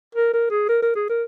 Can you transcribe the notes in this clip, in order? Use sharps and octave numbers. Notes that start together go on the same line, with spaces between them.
A#4
A#4
G#4
A#4
A#4
G#4
A#4